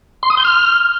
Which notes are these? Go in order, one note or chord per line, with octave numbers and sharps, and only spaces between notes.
C6
D#6
G6
F6